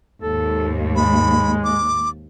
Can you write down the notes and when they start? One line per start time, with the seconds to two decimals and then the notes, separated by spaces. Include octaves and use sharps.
0.22 D#2 G#2 A4
0.96 G#3 B5
1.64 D6